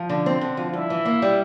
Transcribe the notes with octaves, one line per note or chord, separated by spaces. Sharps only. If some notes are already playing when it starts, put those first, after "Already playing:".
Already playing: F3
D3
C4
D3
F3
G2 E4
E3
A#3
G3